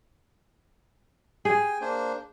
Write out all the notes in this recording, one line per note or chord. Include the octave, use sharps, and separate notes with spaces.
G#4 G5 G#5
A#3 D4 C5